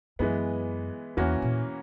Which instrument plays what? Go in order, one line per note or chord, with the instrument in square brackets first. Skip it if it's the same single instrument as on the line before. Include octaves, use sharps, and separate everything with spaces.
[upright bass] F#2 [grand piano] E3 G#3 B3
[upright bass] E2 [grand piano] E3 A#3 C#4 F#4 A#4
[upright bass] A#2